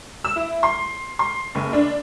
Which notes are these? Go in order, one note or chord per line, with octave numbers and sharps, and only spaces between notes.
E6
E4
C6
C6
F#1
D4